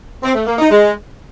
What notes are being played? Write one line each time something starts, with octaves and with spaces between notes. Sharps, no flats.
C4
A3
A#3
D#4
G#3